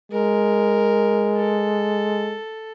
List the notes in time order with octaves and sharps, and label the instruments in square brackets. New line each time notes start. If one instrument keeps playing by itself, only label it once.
[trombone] G#3 [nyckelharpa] A#4
[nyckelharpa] A4